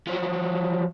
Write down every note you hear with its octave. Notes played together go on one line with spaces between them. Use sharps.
F3 F#3